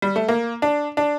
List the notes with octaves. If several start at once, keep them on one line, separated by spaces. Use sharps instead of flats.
G3
A3
A#3
D4
D4